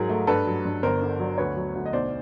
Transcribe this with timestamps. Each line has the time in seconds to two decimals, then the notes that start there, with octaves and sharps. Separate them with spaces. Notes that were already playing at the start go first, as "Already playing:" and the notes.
Already playing: G#2 F#3 G#4 A#4
0.09 A3
0.27 G2 A4 B4
0.47 F#3
0.65 G2
0.83 G1 A#4 C5
1.02 D3
1.19 F#3
1.38 D2 B4 C#5
1.56 F#3
1.75 D2
1.86 D#5
1.93 B1 C5 D5